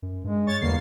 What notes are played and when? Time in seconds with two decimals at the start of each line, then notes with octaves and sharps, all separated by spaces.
0.02 F#2
0.24 G2 G#3
0.47 C#5 C#6 A6
0.61 E2 D3 G3 A#3 C7